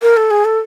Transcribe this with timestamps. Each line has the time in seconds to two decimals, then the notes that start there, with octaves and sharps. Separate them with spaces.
0.02 A#4
0.17 A4
0.31 G#4
0.45 A4